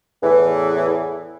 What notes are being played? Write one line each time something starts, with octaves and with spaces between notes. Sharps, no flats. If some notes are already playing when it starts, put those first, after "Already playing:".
E2 A2 E3